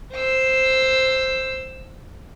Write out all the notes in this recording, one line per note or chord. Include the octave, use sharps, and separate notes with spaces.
C5 E6